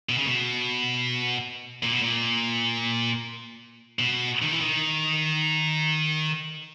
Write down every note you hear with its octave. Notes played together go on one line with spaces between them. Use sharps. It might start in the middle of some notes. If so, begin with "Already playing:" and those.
B2
C#3
B2
A#2
B2
A#2
B2
D#3
E3
D#3